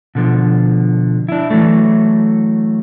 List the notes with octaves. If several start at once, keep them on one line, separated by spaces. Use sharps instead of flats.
B2 D3 F3
D4 E4
E3 F#3 A3